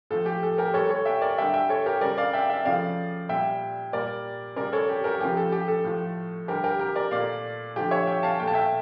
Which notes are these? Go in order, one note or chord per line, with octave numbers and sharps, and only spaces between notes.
A2 F3 A3 A4
G4
A4
G4 A#4
A2 G3 A4 C#5
A4 C#5
E5 G5
A#4 D5
D3 G3 E5 G5
E5 G5
A4 C#5
G4 A#4
C#3 G3 A#4 D5
D5 F5
E5 G5
E5 G5
C#3 F3 A3 D5 F5
A#2 G3 E5 G5
A#2 G3 A#4 D5
C#3 G3 A#4 D5
A4 C#5
G4
G4 A#4
C#3 F3 A3 G4
A4
G4
A4
A2 F3 A3
D3 G3 G4 A#4
G4 A#4
G4 A#4
A#4 D5
A#2 A3 D5 F5
D3 F3 A3 G4
C#5 E5
E5 G5
F5 A5
A#2 A3 G5
A5
E5 G5